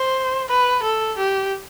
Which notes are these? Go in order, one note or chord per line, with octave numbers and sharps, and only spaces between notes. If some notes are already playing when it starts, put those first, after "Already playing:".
Already playing: C5
B4
A4
G4